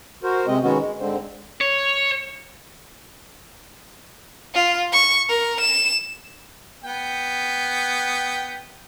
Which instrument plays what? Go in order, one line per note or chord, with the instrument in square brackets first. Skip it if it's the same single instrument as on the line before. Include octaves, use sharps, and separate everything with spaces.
[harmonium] F#4 A#4 C5
C3 G#3 C4 D#5
G#2 D#3 G#3 B3 C#4 F#4
G#3
G#2 D3 C4
[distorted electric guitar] C#5
[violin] F4
C#6
A#4
E7
[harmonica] B3 G5